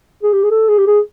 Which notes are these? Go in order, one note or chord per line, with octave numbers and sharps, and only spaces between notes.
G#4
G4
G#4
A4
G#4
G4
G#4